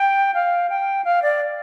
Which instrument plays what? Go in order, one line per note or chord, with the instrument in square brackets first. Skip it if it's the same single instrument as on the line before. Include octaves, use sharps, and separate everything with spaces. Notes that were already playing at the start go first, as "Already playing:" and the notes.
Already playing: [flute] G5
F5
G5
F5
D5